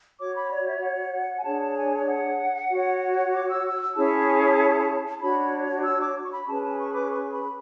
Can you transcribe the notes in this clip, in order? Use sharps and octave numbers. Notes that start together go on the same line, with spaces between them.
F#4 C#5 D6
B5
D5
E5
F#5
G#5
D4 G#4 C#5 A5
A5
G#5
F#5
F#4 C#5
D6
E6
E6
E6
C#4 E4 G#4 C#5 A5
D4 F#4 C#5 B5
E6
D6
C#6
B5
C#4 G#4 B4 A5
A5
C#6
D6
C#6
B5